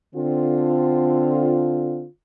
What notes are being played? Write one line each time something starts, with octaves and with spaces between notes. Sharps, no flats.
D3 C4 F4